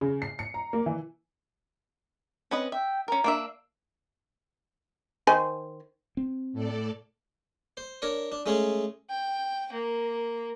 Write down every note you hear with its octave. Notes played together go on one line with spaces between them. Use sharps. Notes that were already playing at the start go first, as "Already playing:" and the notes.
C#3
C7
C#7
A#5
A#3
E3
C4 C#4 B4 D#5
E5 G5
C#4 A#4 A#5
A#3 D4 E5
D#3 C5 G#5
C4
A2 A4 D5
C5
D4 A#4 C#5
D4
G#3 A3 C#4 G#4
G5
A#3